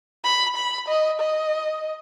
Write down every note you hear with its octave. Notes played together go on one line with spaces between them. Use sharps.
B5
B5
D#5
D#5